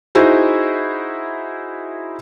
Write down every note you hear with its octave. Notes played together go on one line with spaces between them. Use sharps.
D#4 E4 F#4 G#4 C5